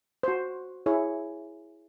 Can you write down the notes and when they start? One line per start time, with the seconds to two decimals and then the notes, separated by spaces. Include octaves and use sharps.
0.23 F#4 C5
0.86 E4 G#4 C#5